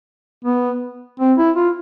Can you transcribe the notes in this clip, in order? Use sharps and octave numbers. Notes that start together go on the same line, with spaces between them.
B3
C4
E4
F4